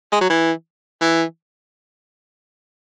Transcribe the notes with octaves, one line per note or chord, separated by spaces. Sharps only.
G#3
F#3
E3
E3